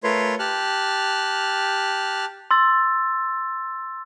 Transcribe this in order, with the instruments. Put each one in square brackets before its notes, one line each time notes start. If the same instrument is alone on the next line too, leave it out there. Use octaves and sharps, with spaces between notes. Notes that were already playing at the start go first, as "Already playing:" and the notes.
[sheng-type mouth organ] A3 F4 A#4 B4 C#5 C6
G4 A5 F6 F#6
[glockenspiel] C6 E6 A6